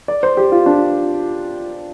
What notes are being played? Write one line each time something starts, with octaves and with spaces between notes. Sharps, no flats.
D5
C5
G4
F4
D4